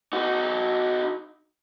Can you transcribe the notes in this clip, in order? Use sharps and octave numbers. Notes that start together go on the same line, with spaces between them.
D#4 F#4